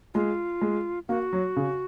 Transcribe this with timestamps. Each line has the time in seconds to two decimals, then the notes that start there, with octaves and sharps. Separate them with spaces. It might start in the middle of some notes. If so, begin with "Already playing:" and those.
0.14 G#3 F4
0.62 G#3
1.08 A#3 F#4
1.33 F#3
1.56 C#3